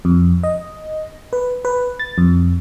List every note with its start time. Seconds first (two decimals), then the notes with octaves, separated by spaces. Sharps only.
0.05 F2
0.43 D#5
1.33 B4
1.65 B4
1.99 A6
2.18 F2